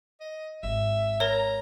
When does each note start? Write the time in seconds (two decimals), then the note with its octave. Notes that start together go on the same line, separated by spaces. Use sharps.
0.21 D#5
0.63 G#1 E5
1.20 A#4 C#5 A#5